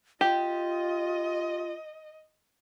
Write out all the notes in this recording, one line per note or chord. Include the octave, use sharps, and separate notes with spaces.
F4 G4 D#5